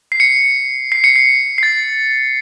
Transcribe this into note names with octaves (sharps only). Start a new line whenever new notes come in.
C7
C#7
C7
C#7
C7
C7
A6